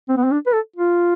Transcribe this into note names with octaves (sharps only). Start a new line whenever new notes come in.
C4
B3
C4
D4
B4
A4
F4